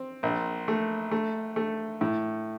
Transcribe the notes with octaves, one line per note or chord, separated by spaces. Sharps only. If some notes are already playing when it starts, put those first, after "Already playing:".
Already playing: C4
A#1
A3
A3
A3
A2